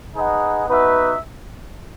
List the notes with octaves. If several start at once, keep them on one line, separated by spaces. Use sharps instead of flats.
D#4 G#4 B4 D#5 F#5
B3 D#4 F#4 B4 E5